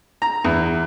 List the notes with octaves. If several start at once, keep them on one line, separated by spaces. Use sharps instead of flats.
A#5
E2